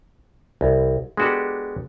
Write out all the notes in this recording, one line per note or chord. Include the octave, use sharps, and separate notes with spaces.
C2
G#3 B3 D4 F#4 G4 A4